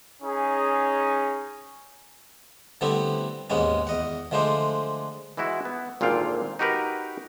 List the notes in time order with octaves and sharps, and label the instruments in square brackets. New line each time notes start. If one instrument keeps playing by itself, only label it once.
[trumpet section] C#4 D#4 G#4
[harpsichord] D3 G3 A3 B3 C4 E4
D#2 G#2 G#3 B3 C#4
E2 D#5 F#5
D3 F3 G#3 A3 D4 C5
[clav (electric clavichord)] E3 G#3 E4 F#4
B3
G#1 A#2 D3 F4 F5 G5
D#4 F#4 G4 A#4 B4